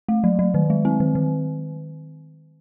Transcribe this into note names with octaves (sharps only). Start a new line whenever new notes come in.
A3
F#3
F#3
D#3
G#3
C4
D#3
D#3